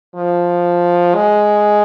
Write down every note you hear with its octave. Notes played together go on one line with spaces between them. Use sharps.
F3
G#3